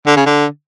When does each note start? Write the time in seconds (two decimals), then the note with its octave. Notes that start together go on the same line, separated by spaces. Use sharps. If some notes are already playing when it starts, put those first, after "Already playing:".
0.07 D3
0.16 C#3
0.26 D3